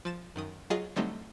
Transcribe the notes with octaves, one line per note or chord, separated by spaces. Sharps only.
F3 A6 E7
F#2 D#3 D#6
F#3 F4 G#4 D#5
D3 F#3 G3 A3 C4 D#4